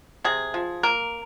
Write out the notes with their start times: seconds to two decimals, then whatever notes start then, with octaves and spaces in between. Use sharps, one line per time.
0.24 C3 G#4
0.54 F3
0.83 A#3 A#4